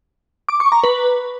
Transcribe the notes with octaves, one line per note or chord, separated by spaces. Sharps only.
D6
C#6
A#5
B4